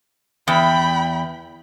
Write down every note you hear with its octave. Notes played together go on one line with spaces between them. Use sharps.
E2 G5 B5